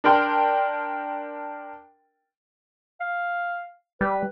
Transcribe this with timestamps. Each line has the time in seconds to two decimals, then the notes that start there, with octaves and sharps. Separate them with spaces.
0.04 D4 A#4 G5 C6
3.00 F5
4.01 G3 B4